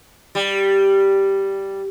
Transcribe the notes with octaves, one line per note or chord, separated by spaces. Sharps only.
G3